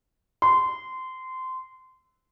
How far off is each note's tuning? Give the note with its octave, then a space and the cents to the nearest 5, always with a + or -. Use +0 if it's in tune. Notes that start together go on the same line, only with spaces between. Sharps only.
C6 -20